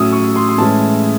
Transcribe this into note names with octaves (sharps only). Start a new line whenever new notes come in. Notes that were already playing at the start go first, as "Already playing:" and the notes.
Already playing: A2 F#3 C#4 D#6 E6
C#6
C6
C6
A2 E3 G#3 C#4 A5